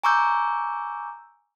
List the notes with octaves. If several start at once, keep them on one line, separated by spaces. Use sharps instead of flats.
G#5 A#5 C#6 D6 E6 G6